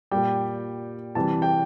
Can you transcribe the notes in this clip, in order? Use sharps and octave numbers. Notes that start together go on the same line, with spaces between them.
A#2 G3 G5
C3 E3 G3 A5
G5